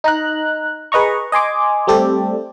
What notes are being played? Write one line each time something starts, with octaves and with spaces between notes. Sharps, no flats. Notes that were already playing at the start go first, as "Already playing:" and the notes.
D#4 A#5 F#6
G#4 B4 D#5 A#5 C#6
D#5 G#5 C6 D6
G3 A3 C4 G4 A4 D5